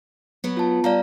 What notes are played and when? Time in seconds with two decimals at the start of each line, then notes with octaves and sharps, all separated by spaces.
0.44 F#3 B3
0.57 F4 A5
0.84 G3 D5 F5 A#5